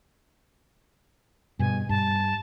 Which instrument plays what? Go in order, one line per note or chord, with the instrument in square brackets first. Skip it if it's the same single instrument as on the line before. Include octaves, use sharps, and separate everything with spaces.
[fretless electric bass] G2 B2 [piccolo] G#5
[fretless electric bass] G2 [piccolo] A5